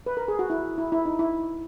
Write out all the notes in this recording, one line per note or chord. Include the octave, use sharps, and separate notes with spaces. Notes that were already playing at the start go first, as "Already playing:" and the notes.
B4
A#4
G#4
F#4
E4
E4
E4
D#4
E4